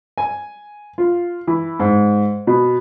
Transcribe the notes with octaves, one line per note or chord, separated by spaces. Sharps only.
G#5
F4
E3
G#2
B2